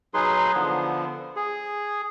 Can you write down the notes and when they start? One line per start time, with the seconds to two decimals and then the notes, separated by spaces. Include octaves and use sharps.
0.14 F#3 D#4 G#4 B4 C6
0.54 D3 F3 B3
1.36 G#4